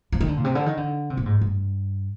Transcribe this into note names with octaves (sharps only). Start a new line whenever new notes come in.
F3
D#3
D3
A#2
C3
D3
D#3
D3
C3
A#2
G#2
G2